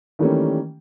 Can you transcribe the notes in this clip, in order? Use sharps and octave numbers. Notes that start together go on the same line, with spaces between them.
D#3 E3 G3 A3 A#3 C#4